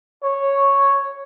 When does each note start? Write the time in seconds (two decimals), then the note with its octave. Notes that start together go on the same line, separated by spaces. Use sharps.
0.23 C#5